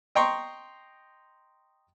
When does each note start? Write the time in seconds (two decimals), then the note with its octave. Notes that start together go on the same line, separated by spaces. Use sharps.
0.15 D#5 G5 A#5 C6 C#6